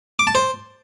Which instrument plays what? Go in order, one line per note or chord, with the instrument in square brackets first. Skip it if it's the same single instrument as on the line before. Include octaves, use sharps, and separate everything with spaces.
[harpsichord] D6
A5
C5